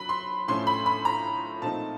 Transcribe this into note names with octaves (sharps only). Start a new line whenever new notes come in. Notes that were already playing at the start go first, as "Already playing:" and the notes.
Already playing: F#3 B5
C6
A2 F3 A3 C#4 C6
B5
B5
A#5
A#2 F3 A3 C4 D#4 A5